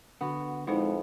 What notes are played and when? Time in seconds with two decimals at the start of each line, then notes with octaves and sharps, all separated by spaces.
0.21 D3 B3 F#4
0.67 F2 G#3 B3 D#4 E4 C5